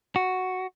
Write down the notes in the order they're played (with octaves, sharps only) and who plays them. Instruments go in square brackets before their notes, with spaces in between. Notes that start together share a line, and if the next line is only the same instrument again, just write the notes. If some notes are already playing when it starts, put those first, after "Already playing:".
[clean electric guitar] F#4